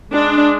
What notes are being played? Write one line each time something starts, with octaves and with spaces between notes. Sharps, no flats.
G#3 D4